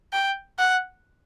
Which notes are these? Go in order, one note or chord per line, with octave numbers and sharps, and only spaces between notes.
G5
F#5